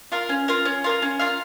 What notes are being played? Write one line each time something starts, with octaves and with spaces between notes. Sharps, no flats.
F4 A#4 F5
C#4
F4 A#4 F5
C#4
F4 A#4 F5
C#4
F4 A#4 F5